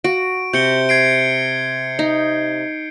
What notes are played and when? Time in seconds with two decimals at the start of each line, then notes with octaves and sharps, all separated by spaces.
0.04 F#4 D7
0.53 C3 G6 C#7 G7
0.89 G#6 C7 D7
1.99 D#4